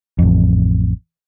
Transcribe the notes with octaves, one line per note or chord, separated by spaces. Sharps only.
A1 F2